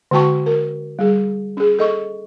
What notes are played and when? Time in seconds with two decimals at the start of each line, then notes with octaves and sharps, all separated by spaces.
0.11 D3 G#3 F#4 G5 A5 C#6
0.46 A#4
0.99 G3 G#4
1.57 C#4 G#4
1.79 A4 D#5 C#6